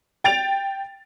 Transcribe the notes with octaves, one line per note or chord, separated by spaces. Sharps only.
G5 A6 D7 F7